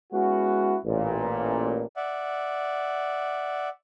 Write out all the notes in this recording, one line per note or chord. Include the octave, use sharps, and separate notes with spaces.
G#3 B3 C#4 E4 F#4
A1 A#2
D5 E5 F#5